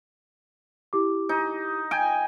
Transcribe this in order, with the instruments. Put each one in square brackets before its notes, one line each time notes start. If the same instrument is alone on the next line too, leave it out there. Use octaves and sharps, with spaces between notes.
[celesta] E4 G4 D6
[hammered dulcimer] D#4
G5 G#5